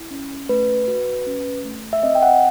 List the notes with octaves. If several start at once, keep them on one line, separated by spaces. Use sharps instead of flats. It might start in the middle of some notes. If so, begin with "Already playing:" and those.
Already playing: E4
C#4
A3 B4
F#4
C#4
A3
E5
C4 D#5
G5
F#5